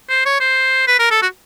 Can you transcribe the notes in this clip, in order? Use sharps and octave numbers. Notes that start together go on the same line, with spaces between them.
C5
C#5
C5
B4
A#4
A4
F#4